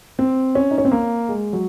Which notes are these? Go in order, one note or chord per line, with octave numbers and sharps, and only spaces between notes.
C4
C#4
D#4
C#4
C4
A#3
G#3
F#3